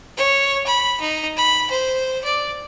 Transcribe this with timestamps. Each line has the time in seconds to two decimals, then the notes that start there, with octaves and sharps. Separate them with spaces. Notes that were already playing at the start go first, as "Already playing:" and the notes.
0.17 C#5
0.66 B5
1.00 D#4
1.37 B5
1.70 C5
2.24 D5